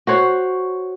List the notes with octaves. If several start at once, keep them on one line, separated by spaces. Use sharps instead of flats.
F#4 C5 C#5